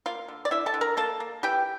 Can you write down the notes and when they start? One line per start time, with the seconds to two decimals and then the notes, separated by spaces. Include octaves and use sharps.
0.06 A#3 F4 F5
0.28 D3
0.45 D5
0.51 D3 E4 E5
0.66 A4 A5
0.74 D3
0.81 A#4 A#5
0.97 A#3 A4 A5
1.20 A#3
1.43 E3 G4 G5